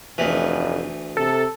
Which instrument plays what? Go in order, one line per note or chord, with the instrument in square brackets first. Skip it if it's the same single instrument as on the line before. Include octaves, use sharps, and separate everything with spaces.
[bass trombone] F1 [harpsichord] D2 E3
[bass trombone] C3 [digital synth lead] A4